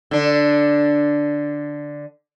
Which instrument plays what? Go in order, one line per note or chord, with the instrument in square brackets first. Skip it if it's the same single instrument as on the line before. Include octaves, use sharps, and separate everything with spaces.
[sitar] D3 D4